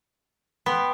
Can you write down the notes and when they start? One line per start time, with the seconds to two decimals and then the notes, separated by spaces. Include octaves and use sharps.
0.66 B3 G5 B5 C6